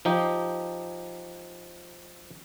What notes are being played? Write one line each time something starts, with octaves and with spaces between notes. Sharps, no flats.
F3 D#4 G4